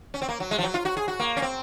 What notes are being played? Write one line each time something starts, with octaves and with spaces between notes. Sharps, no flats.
C#4
C4
A#3
F#3
G#3
F3
F#3
F4
F#4
G#4
F#4
A#3
C#4
C4